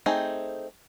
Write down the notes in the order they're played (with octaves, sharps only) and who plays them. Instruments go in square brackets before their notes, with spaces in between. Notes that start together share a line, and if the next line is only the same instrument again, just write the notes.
[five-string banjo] A3 C4 D#4 G#4